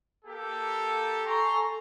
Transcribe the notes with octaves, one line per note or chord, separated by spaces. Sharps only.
A#3 G4 A4
A4 G#5 A#5 C6 C#6